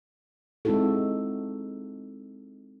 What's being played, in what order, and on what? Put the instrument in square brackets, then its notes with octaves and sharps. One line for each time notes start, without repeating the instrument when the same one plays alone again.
[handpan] G#3 C4 D#4 E4 F#4 A4